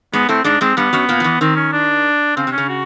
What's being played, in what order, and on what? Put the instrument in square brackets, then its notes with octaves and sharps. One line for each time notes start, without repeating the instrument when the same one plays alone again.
[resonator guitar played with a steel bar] G#2 G#3 [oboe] B3
[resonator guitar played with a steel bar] A2 A3 [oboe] C4
[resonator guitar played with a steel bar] G#2 G#3 [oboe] D4
[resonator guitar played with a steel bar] G#2 G#3 [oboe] C4
[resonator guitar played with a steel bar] G2 G3 [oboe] B3
[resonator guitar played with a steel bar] F#2 F#3
A#2 A#3
F3
E2 E3
[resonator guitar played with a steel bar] D#3 [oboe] C4
[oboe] C#4
D4
[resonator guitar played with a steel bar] C#3 [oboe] C4
[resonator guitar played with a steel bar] C3
[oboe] C#4
[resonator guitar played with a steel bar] C#3
[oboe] F#4